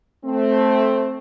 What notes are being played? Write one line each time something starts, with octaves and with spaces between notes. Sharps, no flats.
A3 C4